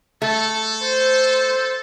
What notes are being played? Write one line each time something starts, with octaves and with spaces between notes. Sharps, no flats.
A3 A4
C5